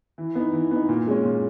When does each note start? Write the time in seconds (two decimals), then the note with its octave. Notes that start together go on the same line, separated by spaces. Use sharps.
0.18 E3
0.35 B3 D#4
0.53 E3
0.71 B3 D#4
0.89 A#2
1.07 G#3 C#4
1.25 A#2